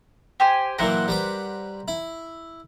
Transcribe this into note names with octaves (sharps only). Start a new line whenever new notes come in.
G4 C5 G#5
A#2 E3 F#3 A#4 C5 F#5
G3 B4 D6
E4